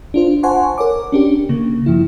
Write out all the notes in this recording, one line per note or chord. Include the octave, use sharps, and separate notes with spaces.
D4 F4 C5
C5 F#5 G#5 A5 C6 C#6
A#4 C#5 D6
C#4 D4 G4
C#3 A#3
G2 F3 E4